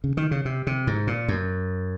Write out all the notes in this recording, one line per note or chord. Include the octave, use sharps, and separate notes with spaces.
C#3
D#3
C#3
C3
C3
G#2
A#2
F#2